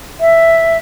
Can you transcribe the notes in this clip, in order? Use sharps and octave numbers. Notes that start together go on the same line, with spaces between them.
E5